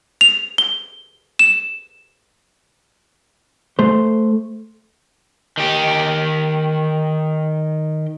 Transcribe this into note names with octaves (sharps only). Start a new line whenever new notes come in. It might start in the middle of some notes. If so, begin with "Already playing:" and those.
F7
G7
E7
A3 C5
D#3 G4